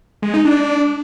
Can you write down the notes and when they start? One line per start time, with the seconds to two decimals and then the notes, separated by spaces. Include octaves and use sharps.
0.22 G#3
0.34 D#4
0.45 D4